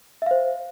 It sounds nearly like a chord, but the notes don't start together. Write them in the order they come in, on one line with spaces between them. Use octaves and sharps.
E5 F5 C5